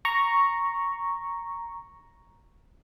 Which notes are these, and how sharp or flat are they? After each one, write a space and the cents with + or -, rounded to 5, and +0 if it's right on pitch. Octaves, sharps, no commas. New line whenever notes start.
A#5 +0 C#6 +0